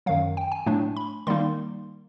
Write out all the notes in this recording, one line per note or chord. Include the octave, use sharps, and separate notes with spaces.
F#2 D#3 F#3 F5
G5
G#5
A2 F#3 A3 D4
B5
D#3 G3 A#3 D#4 C6